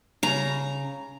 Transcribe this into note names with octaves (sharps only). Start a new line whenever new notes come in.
C#3 A#5